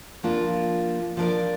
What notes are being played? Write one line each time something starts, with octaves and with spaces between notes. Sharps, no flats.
F3 A#3 D4 F4
F3 D4 A#4 D5